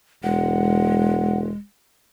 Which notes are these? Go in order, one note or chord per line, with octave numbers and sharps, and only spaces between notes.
E1 G#3 F#5